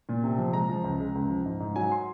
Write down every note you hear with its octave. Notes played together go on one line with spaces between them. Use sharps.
A#2
C3
F3
G#3 A#5
F3
C#2
G#3
C#2
F3
G#2
G#2
F#3 G#5
C6